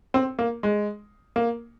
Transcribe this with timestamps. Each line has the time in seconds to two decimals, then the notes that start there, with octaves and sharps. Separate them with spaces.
0.14 C4
0.39 A#3
0.63 G#3
1.36 A#3